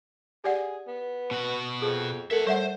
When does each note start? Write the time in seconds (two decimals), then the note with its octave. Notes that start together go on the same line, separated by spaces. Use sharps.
0.44 G4 G#4 D5 F#5
0.87 B3
1.31 B2 F#4
1.82 F2 G#4
2.31 A3 A4 A#4 E5 F#5
2.47 G3 C5 E5 F#5